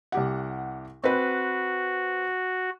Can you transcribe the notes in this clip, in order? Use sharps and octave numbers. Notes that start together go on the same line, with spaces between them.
C2 G4 F#5
C4 F#4 B4